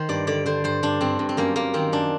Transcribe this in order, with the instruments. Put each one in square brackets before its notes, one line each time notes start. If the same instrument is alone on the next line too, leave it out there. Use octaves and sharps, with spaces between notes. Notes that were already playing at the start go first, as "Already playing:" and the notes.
Already playing: [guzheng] D#3 C5
G2 D5
D3 D5
D3 C5
G2 C5
G2 D4
G2 C4
G2
C4
F#2 A#3
F#2 A#3
D#3 C4
F#2 D4